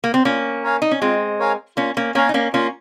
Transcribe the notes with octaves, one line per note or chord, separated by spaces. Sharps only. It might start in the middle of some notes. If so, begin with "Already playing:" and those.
A#3
C4
A#3 C#4 F4
A#4 C#5 F5 G#5
D#4
C#4
G#3 C4 F4
A#4 C#5 F5 G#5
A#3 C#4 F4
A#3 C#4
A#3 C#4 A#4 C#5 F5 G#5
D#4
A#3 C#4
A#3 C#4 F4